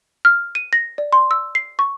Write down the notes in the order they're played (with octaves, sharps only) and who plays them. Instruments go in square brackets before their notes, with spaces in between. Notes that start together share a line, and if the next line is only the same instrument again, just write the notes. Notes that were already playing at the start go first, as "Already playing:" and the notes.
[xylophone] F6
D#7
A#6
D5
C6
E6
C7
C#6